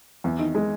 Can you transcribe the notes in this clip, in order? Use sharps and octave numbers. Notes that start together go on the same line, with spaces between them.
E2
D#3
G#3